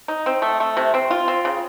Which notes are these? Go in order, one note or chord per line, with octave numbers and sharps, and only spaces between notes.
D#4
C4
A3
A3
C3
C4
F4
C4
C#3